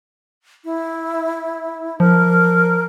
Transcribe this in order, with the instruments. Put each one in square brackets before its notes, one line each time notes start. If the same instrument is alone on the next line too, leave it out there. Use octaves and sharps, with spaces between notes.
[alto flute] E4
[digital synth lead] F3 [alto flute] A#4